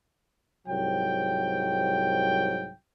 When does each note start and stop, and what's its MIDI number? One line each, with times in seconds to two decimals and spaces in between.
0.67 2.71 36
0.67 2.71 44
0.67 2.71 54
0.67 2.71 79